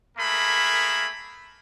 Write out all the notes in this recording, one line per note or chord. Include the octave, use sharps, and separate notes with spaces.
A3 A#3 G#4 A#4 B5